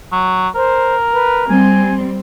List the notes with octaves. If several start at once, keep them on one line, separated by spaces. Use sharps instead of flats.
F#3
A#4 C5
B4
G3 C4 G#5